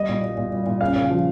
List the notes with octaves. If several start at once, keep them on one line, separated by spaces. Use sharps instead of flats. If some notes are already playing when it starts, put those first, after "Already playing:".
Already playing: G3 D#5
A#2
G3
A#2
G3
A#2
C#3 F5
C#3
F3